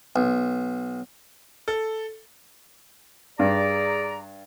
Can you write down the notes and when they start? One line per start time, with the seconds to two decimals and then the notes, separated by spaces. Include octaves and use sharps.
0.16 B1
1.68 A4
3.39 G2 G#4 D5 A#5